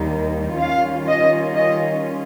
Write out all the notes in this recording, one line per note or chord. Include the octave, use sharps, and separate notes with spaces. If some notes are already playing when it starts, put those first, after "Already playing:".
Already playing: D#2 D#3 G3 A#3 D#4
D#3 G3 C#4 F4 F5
D#5
D#5